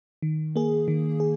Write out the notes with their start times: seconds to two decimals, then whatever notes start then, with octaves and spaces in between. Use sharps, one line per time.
0.22 D#3
0.56 A#3 G#4
0.88 D#3
1.20 G#4